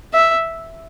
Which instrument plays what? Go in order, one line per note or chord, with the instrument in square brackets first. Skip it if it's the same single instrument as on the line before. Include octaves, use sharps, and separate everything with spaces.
[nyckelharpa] E5